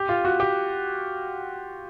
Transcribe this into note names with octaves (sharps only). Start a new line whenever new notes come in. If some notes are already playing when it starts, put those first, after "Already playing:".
Already playing: G4
F4
F#4
G4